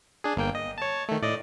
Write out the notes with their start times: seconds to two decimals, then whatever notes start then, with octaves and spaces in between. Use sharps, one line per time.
0.24 D4 G#4
0.36 G1 A#3 G5
0.55 D#5
0.78 C#5 A5
1.09 D#3 A3
1.22 A2 D5 D#5